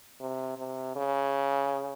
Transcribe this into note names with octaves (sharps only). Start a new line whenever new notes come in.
C3
C3
C#3